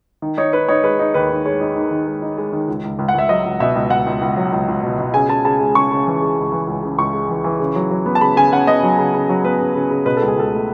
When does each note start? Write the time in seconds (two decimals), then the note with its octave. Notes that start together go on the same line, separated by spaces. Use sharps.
0.22 D#3
0.38 D#4 C#5
0.53 D#4 B4
0.68 D#4 C#5
0.84 G#3 B4
0.99 D#4
1.14 D#2 B4
1.30 D#4
1.46 G#3 C#5
1.61 D#4
1.76 D#3
1.91 D#3
2.07 G#3
2.22 D#4
2.38 G#3
2.53 D#3
2.68 C#2
2.84 C#2
2.99 C#2
3.09 F#5
3.14 C#2 E5
3.29 F#3 D#5
3.45 C#2
3.60 B2 E5
3.75 C#2
3.90 C#2 F#5
4.06 C#2
4.21 C#2
4.37 F#3
4.53 C#2
4.68 C#2
4.84 B2
4.98 B2
5.14 C#3 G#5
5.29 C#3 A5
5.45 C#3 A5
5.60 G#3
5.75 C#3 C#6
5.91 C#3
6.06 E3
6.22 G#3
6.37 C#2
6.52 E3
6.68 C#2
6.83 C#3
6.98 C#2 C#6
7.13 G#3
7.29 E3
7.44 E3
7.60 C#3
7.75 F#3
7.91 F#3
8.06 B3
8.15 A5
8.21 C#3 B5
8.36 C#3 G#5
8.52 C#3 F#5
8.67 B3 D#5
8.83 F#3
8.98 C#3
9.14 C#3
9.29 F#3
9.44 B3 B4
9.59 C#3
9.75 C#3
9.91 C#3
10.06 B2 B4
10.17 C#2 A4
10.28 G#4
10.36 C#2 A4
10.52 A3